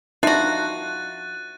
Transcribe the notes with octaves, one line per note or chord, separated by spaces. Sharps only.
F3 D4 D#4 F#4 E5 F#6 A6 D#7